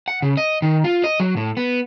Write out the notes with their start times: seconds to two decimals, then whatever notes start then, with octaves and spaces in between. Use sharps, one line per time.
0.08 F#5
0.22 C#3
0.37 D#5
0.62 D#3
0.84 F4
1.04 D#5
1.20 F#3
1.37 A2
1.57 B3